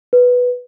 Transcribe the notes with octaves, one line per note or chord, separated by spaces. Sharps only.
B4